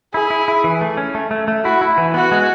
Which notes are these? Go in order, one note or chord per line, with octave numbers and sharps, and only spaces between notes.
E4 G#4
E4
E4
E3
A3
C#4
A3
A3
A3
E4 F#4
E4
E3
B3 F#4
G#3